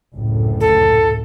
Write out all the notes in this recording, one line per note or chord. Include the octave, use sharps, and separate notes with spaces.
F#1 D2 A2
A4